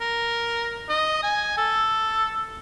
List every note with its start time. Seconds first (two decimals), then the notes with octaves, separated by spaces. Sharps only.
0.01 A#4
0.89 D#5
1.23 G#5
1.58 A4